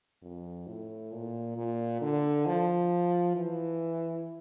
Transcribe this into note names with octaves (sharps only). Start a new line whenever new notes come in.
F2
A2
A#2
A#2
D3
F3
E3